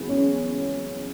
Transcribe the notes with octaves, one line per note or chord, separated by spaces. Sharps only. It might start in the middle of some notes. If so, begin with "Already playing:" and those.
Already playing: E3 F#3 G#3 B3
C#4